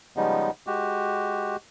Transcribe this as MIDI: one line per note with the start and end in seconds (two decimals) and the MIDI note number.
0.17 0.50 49
0.17 0.50 53
0.17 0.50 55
0.17 0.50 56
0.17 0.50 59
0.17 0.50 63
0.67 1.56 56
0.67 1.56 66
0.67 1.56 67